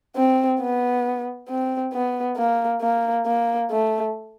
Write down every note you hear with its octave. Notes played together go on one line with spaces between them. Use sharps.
C4
B3
C4
B3
A#3
A#3
A#3
A3